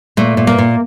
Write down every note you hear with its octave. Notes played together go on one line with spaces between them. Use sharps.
A#2 A3
A#2
A#3
A#2